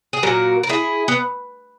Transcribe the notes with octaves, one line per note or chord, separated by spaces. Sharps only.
G#4
A#2 F#3 F#4 A#4
A#4
E4 G#4
B3